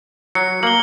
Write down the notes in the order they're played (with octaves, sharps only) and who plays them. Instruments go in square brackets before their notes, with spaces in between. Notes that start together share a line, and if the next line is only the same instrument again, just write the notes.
[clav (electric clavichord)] F#3 [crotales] C#7
[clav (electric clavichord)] A#3 [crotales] F#7 G7